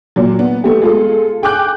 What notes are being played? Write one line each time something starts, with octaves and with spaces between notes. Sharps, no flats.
A#2 F#3
B3
A3 B3 G4
G#3 F4 A4
G#4 G5 G#5 D6 F#6 G6